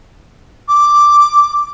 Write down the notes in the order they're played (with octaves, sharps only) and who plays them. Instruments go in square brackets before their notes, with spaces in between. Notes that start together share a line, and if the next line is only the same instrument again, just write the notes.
[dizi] D6